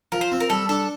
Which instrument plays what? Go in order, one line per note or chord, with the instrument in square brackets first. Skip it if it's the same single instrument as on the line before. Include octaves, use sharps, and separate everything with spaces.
[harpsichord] F3 [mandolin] A#4
[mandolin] C5
[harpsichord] C4
[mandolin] A#4
[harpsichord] G3 [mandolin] A4
[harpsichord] D4 [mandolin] A4